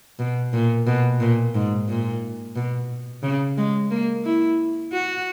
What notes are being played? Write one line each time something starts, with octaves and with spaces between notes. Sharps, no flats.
B2
A#2
B2
A#2
G#2
A#2
B2
C#3
G#3
A#3
E4
F#4